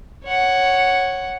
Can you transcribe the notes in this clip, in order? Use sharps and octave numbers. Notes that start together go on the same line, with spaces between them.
C#5 F#5